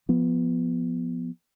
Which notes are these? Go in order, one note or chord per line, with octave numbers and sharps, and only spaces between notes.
F3 B3